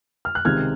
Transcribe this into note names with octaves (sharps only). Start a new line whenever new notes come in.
F6
F#6
C#2 C3 D#3 G#3 C4 F6 G#6